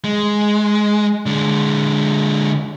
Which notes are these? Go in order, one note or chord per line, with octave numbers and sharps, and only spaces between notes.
G#3
D3 G#3